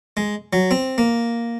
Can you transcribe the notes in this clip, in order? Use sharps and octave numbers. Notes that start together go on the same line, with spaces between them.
G#3
F#3
C4
A#3